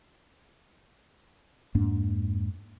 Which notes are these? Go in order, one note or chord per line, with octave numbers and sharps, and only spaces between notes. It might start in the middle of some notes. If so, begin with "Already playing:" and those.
F2 G#2 A#3 D4